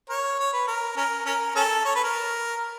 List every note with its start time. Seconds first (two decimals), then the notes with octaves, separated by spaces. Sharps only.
0.10 A#4 C#5
0.39 C#5
0.53 B4
0.67 A#4
0.97 C#4 A#4
1.26 C#4 A#4
1.56 C#4 A4
1.85 C#5
1.95 B4
2.04 A#4